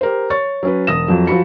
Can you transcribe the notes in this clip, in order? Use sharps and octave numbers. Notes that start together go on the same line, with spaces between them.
G4 A#4 C5
C#5 C#6 A6
F#3 C#4 B4
E1 D#6 A#6 E7
F2 F3 F#3
F3 F#3 F#4 B5 C#7